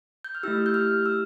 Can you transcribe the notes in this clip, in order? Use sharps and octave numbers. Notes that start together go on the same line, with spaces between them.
G6
F6
A3 E4 G4 E6
G6
F6
E6